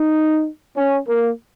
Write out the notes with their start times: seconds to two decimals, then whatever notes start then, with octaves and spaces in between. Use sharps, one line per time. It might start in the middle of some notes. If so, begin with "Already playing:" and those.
Already playing: D#4
0.76 C#4
1.07 A#3